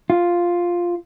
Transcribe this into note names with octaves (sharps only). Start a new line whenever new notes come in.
F4